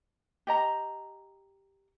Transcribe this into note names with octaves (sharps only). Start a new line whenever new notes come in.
G4 D#5 A#5